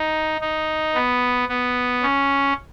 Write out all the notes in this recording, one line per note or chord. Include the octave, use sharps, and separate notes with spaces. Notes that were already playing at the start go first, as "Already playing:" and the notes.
Already playing: D#4
D#4
B3
B3
C#4